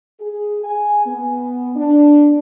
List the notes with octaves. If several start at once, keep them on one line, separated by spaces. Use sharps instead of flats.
G#4
G#5
B3
D4